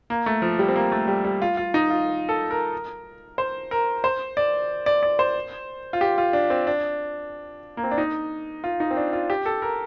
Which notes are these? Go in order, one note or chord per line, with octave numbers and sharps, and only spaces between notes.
A#3
A3
F3
G3
C4
A#3
A3
G3
G3
F4
F4
D#4
F4
A4
A#4
C5
A#4
C5
D5
D5
D5
C5
F4
G4
F4
D4
C4
D4
A#3
C4
D4
D#4
F4
D#4
C4
D4
F4
G4
A4
A#4